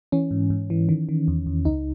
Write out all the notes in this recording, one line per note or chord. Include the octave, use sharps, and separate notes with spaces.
E3 C#4
G#2
G#2
E3
D#3
D#3
E2
E2
C#2 D#4